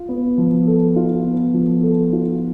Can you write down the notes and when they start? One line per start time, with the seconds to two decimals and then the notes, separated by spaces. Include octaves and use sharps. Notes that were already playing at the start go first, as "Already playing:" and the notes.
Already playing: F4
0.09 B3
0.38 F3
0.67 A4
0.96 F4
1.25 B3
1.54 F3
1.83 A4
2.13 F4